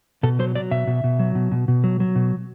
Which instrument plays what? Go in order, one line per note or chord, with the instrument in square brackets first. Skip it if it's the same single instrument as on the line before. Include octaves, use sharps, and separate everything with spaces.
[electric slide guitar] B2 A4
F#3 C5
F#3 D5
B2 E5
B2
B2
F#3
B2
B2
B2
F#3
F#3
B2